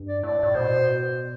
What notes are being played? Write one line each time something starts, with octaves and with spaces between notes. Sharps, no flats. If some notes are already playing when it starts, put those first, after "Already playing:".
Already playing: G2
D5
A2 D5
A2
B2 C5